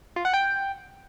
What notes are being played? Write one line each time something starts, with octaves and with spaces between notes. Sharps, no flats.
F4
F#5
G5